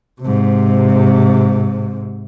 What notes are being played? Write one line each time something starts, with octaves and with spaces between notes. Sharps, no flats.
G#2 C3